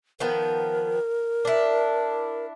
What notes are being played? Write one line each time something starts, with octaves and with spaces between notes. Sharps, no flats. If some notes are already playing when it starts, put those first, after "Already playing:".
D#3 F3 B3 A#4
D4 E4